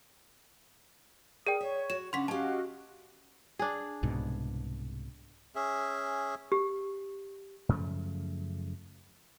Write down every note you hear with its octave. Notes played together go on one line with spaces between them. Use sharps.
G#4 A#4 D5 G5 D#6
C#5 E5
F#4 E7
C#3 C#4 D4 F#5 C6 B6
C#4 F#4 G4 D#5 F5 A5
D4 G#4
C2 G#2 B2
C#4 G#4 E5
G4
F#2 C#3 F3 A3